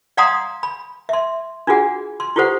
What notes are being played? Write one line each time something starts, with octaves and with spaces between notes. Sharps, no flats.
D5 F5 F#5 A#5 C6 D#6
B5
E5 C6
D4 F4 F#4 G#4 F#5
C6
E4 F4 G4 A4 C5 F#5